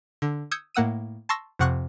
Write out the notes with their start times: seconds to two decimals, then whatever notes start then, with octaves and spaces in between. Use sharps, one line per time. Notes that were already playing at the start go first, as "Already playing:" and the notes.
0.22 D3
0.51 D#6 E6 G6 G#6 C#7
0.75 A2 A#3 F#5 E6 D#7
1.29 A5 C6 C#6 E6 A#6
1.59 F2 C3 F#5 C#6 F#6